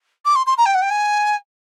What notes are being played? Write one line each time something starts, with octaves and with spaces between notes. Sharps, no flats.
D6
C6
C6
A#5
G5
F#5
G5
G#5